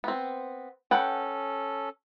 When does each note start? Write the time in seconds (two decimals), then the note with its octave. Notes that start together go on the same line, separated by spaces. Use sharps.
0.04 B3 C4
0.91 C#4 A4 B4 F#5 G5